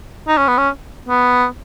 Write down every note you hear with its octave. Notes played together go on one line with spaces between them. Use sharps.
D#4
C#4
B3
C#4
B3